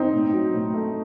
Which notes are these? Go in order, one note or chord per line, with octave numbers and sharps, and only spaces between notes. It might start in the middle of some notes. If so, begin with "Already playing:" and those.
Already playing: C4 D#4
A2
F#3
A2
A3